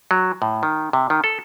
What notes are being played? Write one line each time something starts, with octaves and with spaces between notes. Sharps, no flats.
F#3
A2
D#3
C3
D#3
A4